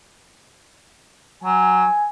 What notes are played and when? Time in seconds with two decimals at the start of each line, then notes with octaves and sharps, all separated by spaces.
1.44 F#3 G#5